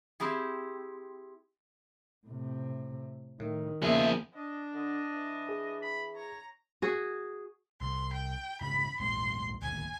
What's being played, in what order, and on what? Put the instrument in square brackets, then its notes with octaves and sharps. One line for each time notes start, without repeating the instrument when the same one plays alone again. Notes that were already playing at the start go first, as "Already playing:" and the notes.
[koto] C4 E4 G4 G#4
[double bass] A2 C3
[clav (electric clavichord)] A2 [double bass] D#3
[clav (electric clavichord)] E2 C#3 [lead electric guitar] F3 G#4 [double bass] A#3 B3 [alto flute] E5
[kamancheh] D4 [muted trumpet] D#5
[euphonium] D3 [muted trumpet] D#5
[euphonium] E3
[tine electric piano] G#4
[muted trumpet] B5
[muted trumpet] C#5 [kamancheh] A#5
[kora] F#4 G#4
[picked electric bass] C2 [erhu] C6
[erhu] G5
[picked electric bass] G#2 C#3 E3 [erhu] B5
[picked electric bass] A#1 E2 G#2 [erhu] C6
[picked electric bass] D1 G1 D#2 [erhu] G#5